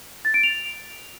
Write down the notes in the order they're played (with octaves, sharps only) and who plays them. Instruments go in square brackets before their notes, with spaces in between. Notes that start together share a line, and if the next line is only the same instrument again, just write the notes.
[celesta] A6
D7
F7